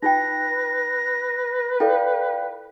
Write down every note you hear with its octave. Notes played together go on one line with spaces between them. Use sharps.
D#4 F4 B4 G5 A#6
E4 F4 A4 D5 F5 G5